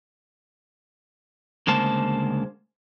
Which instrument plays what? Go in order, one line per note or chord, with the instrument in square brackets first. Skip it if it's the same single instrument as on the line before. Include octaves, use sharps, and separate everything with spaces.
[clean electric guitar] D2 C#3 G#3 A#3 C5 A5